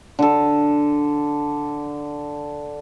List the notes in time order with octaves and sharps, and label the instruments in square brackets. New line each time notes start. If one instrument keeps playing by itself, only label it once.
[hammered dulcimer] D3 A4